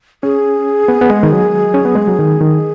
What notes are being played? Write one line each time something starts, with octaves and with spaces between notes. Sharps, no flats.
C#4 G#4
B3
B3
G#3
D#3
F#3
C#4
B3
G#3
F#3
D#3
D#3